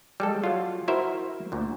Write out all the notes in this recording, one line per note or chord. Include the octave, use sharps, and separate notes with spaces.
G3 G#3 A4
F#3 F4
E4 F#4 A#4 C5 E5
D2 A#2